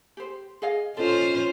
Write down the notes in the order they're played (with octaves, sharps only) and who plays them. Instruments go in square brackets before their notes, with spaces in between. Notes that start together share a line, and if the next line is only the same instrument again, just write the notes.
[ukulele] G4 C5
G#4 D#5 F5
[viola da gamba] C#4 F4 C5 [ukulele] A4 D#5